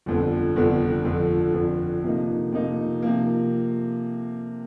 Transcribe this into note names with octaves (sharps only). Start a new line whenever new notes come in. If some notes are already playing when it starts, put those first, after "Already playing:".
G1 F2 D3 F3
G1 F2 D3 F3
F2 D3 F3
F2 D3 F3
C3 F3 A#3 D#4
C3 F3 A#3 D#4
C3 F3 A#3